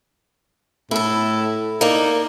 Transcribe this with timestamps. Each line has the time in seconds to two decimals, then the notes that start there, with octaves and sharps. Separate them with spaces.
0.91 A2 E4 A4
1.81 A#3 D4 D#4